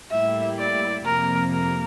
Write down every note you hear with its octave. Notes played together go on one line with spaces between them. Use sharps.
A2 G3 A#3 E4 G4 E5
D5
F2 C3 F3 A#3 A#4
A#4